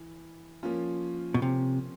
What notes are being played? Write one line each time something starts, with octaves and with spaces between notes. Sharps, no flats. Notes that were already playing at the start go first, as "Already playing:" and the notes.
Already playing: E3
F3 A#3 C#4 F4
B2
C3